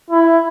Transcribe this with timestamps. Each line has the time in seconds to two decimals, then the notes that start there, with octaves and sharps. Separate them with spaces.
0.10 E4